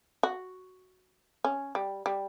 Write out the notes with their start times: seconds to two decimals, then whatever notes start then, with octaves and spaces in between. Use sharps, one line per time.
0.23 F#4
1.44 C#4
1.75 G3
2.06 G3